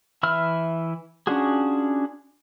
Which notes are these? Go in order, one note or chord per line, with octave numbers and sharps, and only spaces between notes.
E3 E5 B5 E6 F6
C#4 D4 F4 F#4 G#4